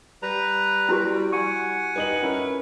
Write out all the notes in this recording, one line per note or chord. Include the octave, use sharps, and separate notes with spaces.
G3 B4 A#5
E4 F#4 G4
F#5 G#5 C#6
G3 D#4 B4 F#7
C#4 E4 A#4